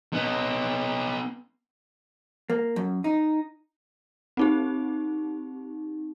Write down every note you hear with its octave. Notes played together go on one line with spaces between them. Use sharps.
B3 D#4
A#3
F#2
D#4
C4 D#4 G4